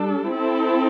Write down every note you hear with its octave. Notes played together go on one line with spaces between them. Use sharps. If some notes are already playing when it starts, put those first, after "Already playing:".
Already playing: G3 D4 A4
C4 E4 A4